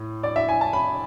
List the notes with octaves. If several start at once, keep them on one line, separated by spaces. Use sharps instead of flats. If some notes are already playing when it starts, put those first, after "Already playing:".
Already playing: A2
D5
E5
G#5
A5
B5